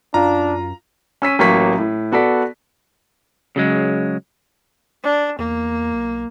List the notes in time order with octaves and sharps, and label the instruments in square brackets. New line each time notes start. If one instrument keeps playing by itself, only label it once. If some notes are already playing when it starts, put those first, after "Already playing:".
[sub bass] F#2 [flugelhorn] D4 [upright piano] F4 [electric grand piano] A#5
[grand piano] C#4 E6 B6 D#7
A1 F#3 A#3 C#6 B6
A2
B3 F#4 A4 D5 B6
[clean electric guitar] C#3 F#3 G#3
[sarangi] D4
[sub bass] E2 [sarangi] A#3
[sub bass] B1